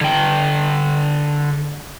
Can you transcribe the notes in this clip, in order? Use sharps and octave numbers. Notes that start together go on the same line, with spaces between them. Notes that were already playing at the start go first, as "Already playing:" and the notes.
D3 G5